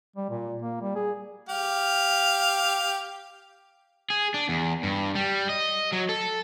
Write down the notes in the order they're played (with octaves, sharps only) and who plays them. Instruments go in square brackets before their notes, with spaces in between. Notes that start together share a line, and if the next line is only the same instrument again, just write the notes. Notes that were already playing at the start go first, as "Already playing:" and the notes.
[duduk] G3
A#2
A#3
G3
G#4
[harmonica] G4 F5
[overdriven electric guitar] G#4
D4
E2
G2
G3
D#5
F#3
A4